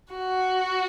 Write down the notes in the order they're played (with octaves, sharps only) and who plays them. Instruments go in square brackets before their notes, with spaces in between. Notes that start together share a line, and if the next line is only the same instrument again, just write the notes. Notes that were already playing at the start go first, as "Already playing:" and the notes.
[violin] F#4